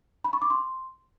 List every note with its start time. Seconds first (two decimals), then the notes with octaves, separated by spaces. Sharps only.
0.24 B5
0.33 C#6
0.42 D6
0.50 C6